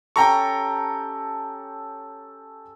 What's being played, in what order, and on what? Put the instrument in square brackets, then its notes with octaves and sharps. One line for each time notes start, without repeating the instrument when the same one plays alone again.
[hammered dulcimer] C#4 G4 A4 [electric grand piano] G5 A#5 C#6